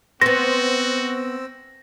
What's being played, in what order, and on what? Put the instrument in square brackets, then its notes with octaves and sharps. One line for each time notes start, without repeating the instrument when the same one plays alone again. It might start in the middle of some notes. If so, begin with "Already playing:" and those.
[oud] B3 C5 [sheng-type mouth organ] C4 E6 [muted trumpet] F#4 [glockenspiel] A#6